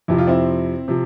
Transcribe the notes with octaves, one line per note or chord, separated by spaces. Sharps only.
F2 C3 F3 E4
F4
C4 E4
C3 F3